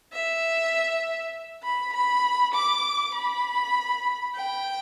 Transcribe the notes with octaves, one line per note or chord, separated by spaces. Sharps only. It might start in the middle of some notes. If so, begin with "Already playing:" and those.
E5
B5
B5
D6
B5
G5